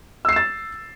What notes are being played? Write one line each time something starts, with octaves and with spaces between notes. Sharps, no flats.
E6 A6 C7 E7